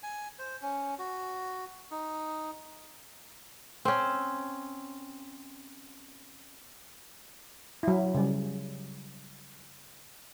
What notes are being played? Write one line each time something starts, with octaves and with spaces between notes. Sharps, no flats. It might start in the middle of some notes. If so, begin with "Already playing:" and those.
G#5
C5
C#4
F#4
D#4
C4 C#4
F#3 E4
C#3 G3